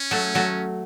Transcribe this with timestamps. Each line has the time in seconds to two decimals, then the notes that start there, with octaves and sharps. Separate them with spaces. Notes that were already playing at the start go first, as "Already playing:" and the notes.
Already playing: C#4
0.11 F#3 A3
0.35 F#3 A3